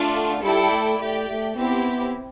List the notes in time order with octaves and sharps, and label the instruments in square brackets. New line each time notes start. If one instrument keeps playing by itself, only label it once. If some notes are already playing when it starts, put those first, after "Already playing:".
Already playing: [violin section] A3 D4 F4
[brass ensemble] D3
[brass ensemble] G3 [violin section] E4 A4 D5 G5
[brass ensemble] A3
[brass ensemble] A3 [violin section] G4 D5 G5
[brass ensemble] A3
[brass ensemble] B3 [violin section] C4 E4 G4